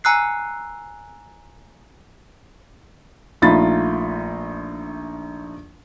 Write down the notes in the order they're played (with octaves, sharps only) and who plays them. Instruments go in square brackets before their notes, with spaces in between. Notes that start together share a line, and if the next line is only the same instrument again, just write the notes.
[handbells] G#5 A#5 E6 F#6 C7
[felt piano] A#1 A3 D#4 F4 B5 A6